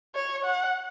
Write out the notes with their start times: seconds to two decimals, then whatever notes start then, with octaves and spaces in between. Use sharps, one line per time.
0.15 C#5
0.45 F#5